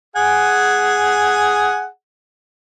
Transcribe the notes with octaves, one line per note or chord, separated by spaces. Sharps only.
G#4 F#5 G#5